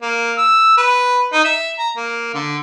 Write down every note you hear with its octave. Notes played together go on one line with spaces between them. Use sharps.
A#3
E6
B4
D#4
E5
A#5
A#3
D3